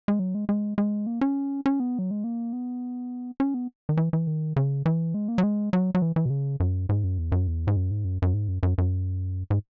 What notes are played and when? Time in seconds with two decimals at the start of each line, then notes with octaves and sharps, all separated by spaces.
0.08 G#3
0.19 F#3
0.35 G#3
0.49 G#3
0.78 G#3
1.07 A#3
1.21 C#4
1.66 C#4
1.80 B3
1.99 F#3
2.11 G#3
2.24 A#3
2.53 B3
3.40 C#4
3.54 B3
3.89 D#3
3.97 E3
4.13 E3
4.27 D#3
4.56 C#3
4.86 E3
5.14 G#3
5.28 A#3
5.38 F#3
5.43 G#3
5.73 F#3
5.95 F#3
6.02 E3
6.16 E3
6.26 B2
6.30 C#3
6.60 F#2
6.89 G#2
7.04 F#2
7.18 E2
7.32 F#2
7.47 E2
7.67 G#2
7.76 F#2
7.91 G#2
8.05 F#2
8.22 F#2
8.34 G#2
8.48 F#2
8.63 F#2
8.78 F#2
9.50 G#2